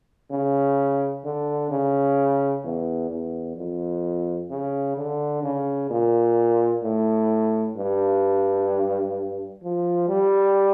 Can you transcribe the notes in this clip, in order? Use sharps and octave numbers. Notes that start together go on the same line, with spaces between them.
C#3
D3
C#3
E2
E2
F2
C#3
D3
C#3
A#2
A2
G2
F3
G3